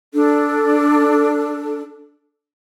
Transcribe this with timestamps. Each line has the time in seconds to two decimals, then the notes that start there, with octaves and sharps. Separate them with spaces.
0.12 D4 A4